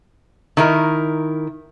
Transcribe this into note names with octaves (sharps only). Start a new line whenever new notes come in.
D#3 E4 A#4